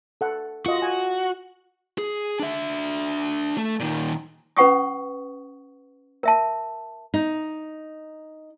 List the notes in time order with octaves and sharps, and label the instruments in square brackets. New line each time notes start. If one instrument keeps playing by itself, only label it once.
[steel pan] A4 F#5
[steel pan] F4 D#5 [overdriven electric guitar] F#4
[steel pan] G#5
[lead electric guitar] G#4
D4 E5
A3
A#2 D#3
[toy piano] C#4 B4 F#5 C#6 D#6
A#4 E5 A5
[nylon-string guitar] D#4